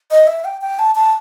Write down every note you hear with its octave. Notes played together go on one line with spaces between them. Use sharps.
D#5
E5
G5
G5
A5
A5